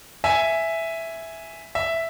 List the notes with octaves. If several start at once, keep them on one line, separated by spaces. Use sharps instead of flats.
E5 G#5
E5